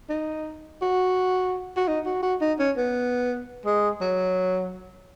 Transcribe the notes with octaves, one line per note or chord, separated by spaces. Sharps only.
D#4
F#4
F#4
D#4
F#4
F#4
D#4
C#4
B3
G#3
F#3